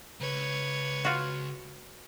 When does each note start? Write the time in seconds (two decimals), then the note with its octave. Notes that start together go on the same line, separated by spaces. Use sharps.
0.20 C#2 B4 C#5
1.05 F4 F#4